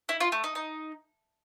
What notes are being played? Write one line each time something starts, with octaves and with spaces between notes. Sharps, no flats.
E4
F4
A3
D#4
D#4